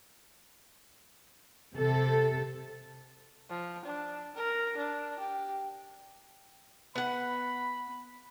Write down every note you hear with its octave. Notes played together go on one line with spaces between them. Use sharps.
C3 A4
F3
D4
A#4
D4
G4
B3 F#5 B5